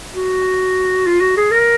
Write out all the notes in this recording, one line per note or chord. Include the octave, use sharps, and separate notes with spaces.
F#4
F4
F#4
G#4
A#4